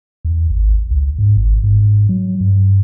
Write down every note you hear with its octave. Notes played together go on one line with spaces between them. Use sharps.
E2
G#1
C#2
G#2
G#1
G#2
F#3
G2